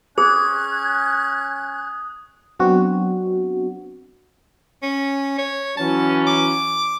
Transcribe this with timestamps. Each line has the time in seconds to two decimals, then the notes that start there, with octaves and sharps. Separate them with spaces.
0.18 C#4 G#4 D#6 F#6 G#6
2.59 F#3 B3 C4 D4 F#4
4.83 C#4
5.38 C#5
5.77 E3 F#3 C#4 A5
6.27 D6